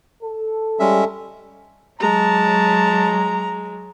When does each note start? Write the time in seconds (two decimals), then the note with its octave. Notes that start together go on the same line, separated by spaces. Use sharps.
0.22 A4
0.80 G3 G#3 C#4 E5
2.01 F#3 G#3 A5 A#5